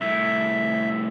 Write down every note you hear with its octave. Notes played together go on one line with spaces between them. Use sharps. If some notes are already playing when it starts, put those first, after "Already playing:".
C2 A2 E5